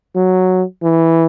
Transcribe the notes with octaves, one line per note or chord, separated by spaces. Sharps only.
F#3
E3